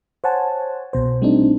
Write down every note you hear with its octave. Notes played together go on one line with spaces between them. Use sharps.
C5 C#5 F#5 G#5 A5
C2 B2 C5
G3 A3 C4 D4 D#4